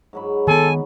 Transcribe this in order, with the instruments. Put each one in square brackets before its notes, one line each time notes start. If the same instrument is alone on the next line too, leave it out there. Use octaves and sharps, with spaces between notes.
[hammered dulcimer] G#2 F#3 B5
[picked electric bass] D#3 B3 [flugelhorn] A4 [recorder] G#5